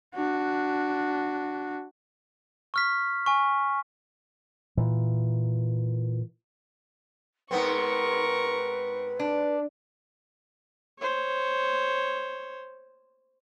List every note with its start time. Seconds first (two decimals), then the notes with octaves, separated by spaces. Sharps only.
0.15 D4 F#4
2.74 C#6 F6 B6
3.26 G#5 C#6
4.77 A#2 E3
7.51 G#2 B3 C4 A#4 B4 C#6
9.20 D4
10.99 C5 C#5